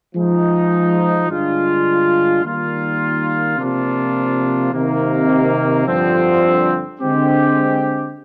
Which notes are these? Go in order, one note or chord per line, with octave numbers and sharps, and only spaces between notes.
F3 G#3 D#4
G2 D3 G#3 D4 F4
D#3 G3 A#3 F4
C3 F3 A#3 D4 F4
C3 D#3 A#3
G2 D3 F3 C4
D3 G#3 C4 G4